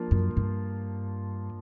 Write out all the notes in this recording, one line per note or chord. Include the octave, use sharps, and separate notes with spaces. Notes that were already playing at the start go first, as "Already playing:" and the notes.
Already playing: F3 A#3 D4 F4
F#2
G2